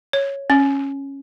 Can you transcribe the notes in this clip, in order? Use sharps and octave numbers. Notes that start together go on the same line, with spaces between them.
C#5
C#4